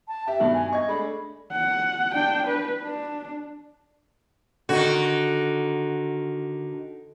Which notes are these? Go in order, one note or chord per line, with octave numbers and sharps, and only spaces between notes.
A5
G4 E5
G2 B2 D#3
G#5
D#5 C#6 G#6
G#3 A3 D4 B5
F#5
D4 G5
B4
D4
D3 D#3 F#4